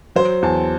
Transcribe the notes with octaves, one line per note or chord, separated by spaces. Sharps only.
F#3 C5
E2 A5